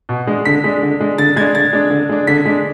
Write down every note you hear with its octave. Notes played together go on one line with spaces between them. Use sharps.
B2
G#3 D4
D3 B6
G#3 D4
D3
G#3 D4
D3 A6
G#3 D4 G#6
D3 A6
G#3 D4
D3
G#3 D4
D3 B6
G#3 D4